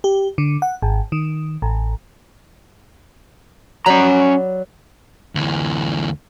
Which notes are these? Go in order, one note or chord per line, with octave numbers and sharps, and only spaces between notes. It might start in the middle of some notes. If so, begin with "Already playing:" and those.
G4
D3
F#5
G#1
D#3
A1
F#3 C#4 D5 A#5 B5
D2 E3